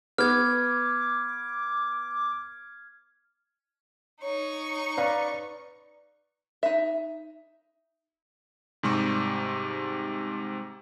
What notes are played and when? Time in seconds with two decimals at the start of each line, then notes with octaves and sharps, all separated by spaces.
0.18 B3 D6 F6 G#6
4.22 D#4 C#5 C#6
4.97 B4 D5 F5 A#5
6.63 D#4 E5
8.83 G#2 C3 G3 C#6